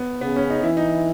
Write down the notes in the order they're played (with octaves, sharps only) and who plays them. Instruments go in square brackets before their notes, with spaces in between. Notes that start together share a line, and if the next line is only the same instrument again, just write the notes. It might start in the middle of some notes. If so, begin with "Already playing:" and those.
Already playing: [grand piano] B3
[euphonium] C#3 [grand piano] B3
[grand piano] C#4
D#4
[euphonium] E3 [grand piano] E4
[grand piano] D#4